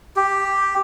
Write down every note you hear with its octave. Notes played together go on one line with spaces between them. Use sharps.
G4